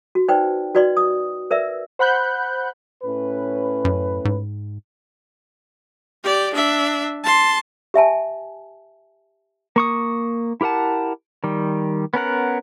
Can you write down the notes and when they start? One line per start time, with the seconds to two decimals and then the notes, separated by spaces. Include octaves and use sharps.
0.15 F#4
0.28 D#4 B4 C5 D5 G5
0.75 F#4 B4 D5 D#5 C6
0.97 D#6
1.51 A#4 B4 D5 E5 E6
1.99 C5 F#5 B5 F#6 G6
3.03 A2 C#4 B4
3.85 F#2
4.25 G#2
6.23 G4 D5
6.54 D4 E5
7.23 A5 C6
7.94 G4 E5 G#5 A5
9.76 A#3 C#6 D#6
10.61 E4 G4 A#4 F#5 A5
11.44 D#3 G3
12.14 B3 C#4 A#4 F#5